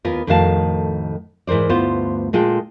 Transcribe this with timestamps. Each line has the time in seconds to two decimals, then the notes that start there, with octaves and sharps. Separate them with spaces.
0.05 D#2 B3 F4 A#4
0.27 F2 A2 D#3 F#4 F5 A5
1.47 G#2 E3 A#4 C5 D5
1.69 D2 G2 B3 F4 C5
2.33 A#2 G#3 F4 A4 G5